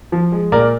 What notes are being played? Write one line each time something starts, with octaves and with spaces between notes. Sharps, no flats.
F3
G#3
A#2 A#4 D5